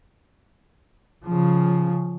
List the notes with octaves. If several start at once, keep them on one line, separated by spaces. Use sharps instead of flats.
C#3 F3